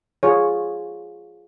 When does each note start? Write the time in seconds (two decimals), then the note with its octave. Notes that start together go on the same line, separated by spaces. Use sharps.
0.23 F4 G#4 C#5